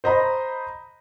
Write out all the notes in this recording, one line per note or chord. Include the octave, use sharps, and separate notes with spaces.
C5 D#5 A#5 B5